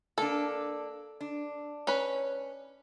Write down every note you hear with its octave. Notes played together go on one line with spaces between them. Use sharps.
A#3 D4 A4
D4
C#4 B4